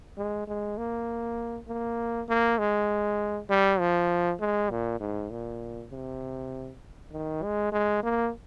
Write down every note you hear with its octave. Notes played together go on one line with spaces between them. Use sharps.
G#3
G#3
A#3
A#3
A#3
G#3
G3
F3
G#3
A#2
G#2
A#2
C3
D#3
G#3
G#3
A#3